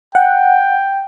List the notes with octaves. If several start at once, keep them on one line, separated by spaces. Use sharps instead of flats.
F#5 G5